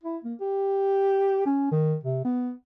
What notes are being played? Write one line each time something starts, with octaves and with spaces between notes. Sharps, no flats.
E4
A#3
G4
C#4
D#3
C3
B3